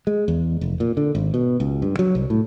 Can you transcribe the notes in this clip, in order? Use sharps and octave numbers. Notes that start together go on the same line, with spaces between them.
G#3
E2
F1
A#2
D3
G#1
B2
C#2
G2
F#3
C2
A2